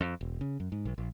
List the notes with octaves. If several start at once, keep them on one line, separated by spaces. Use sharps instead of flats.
F2
E1
C#3
F#2
G#2
B1
A#1